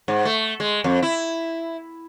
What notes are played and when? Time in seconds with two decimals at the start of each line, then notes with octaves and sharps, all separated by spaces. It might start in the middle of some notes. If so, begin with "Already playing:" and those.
0.08 G#2
0.25 A3
0.60 G#3
0.84 F2
1.03 E4